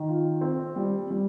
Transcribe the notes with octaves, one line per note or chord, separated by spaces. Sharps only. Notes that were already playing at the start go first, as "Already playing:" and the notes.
Already playing: D#3
F4
C4
G3
G3